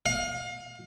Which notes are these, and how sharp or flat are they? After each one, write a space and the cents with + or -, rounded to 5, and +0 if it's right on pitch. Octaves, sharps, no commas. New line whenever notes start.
F5 +35